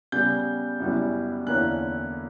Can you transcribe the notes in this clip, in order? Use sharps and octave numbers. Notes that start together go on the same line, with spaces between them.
C#3 G3 B3 G6
F#2 C#3 G3 B3 E4
E2 D3 A#3 C#4 E4 F#6